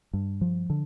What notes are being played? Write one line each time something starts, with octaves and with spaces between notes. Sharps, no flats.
G2
F3
D3